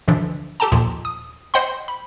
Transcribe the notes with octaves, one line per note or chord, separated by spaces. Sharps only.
D2 B2 D3 E3 F3 D4
G4 A4 G5 A5 A#5
D#2 A#2 F3
D#6
C5 D#5 F#5 G5 B5 C6
B5